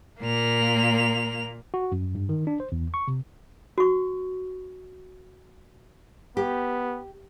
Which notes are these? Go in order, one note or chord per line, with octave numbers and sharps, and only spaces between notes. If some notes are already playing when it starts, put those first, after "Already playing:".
A#2 A#3 F7
F#4
F#2
G2
D#3
D4
C5
E2
C#6
C3
F#4 C#6
B3 G4